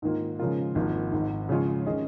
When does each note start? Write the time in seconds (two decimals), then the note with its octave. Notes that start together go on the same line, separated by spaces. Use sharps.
0.02 G#2 D#3 A#3 F4
0.39 C#3 F3 G#3 F4 A#4
0.75 G#1 G#2 F3 A#3 F4
1.12 G#1 G#2 D#3
1.49 C#3 F3 G#3 F4 C#5
1.85 D#3 C#4 G#4 D#5